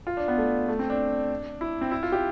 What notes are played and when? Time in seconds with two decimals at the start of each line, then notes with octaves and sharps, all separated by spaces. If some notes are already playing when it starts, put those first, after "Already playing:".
0.07 F4
0.17 D4
0.28 B3
0.38 A3
0.68 A3
0.79 C4
0.90 D4
1.61 E4
1.81 C4
1.91 E4
2.03 F4
2.12 G4